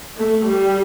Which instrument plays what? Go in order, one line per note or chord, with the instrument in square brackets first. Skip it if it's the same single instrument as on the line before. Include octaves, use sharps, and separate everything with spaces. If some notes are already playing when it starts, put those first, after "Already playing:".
[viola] A3
G3